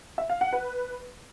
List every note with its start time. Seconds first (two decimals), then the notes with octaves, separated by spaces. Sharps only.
0.18 E5
0.29 F5
0.41 F#5
0.53 B4